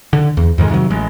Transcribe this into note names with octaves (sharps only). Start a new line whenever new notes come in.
D3
E2
F2 G#2 D#3 G#3
C3 D#3 E3 F#3
A1 G#3